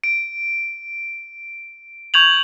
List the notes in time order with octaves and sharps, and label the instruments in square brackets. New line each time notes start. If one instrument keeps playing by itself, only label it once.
[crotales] D7
C#6 G6 G#6 F7 F#7